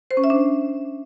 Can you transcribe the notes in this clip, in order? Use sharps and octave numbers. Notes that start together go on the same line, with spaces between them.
C5
C#4
E5
D4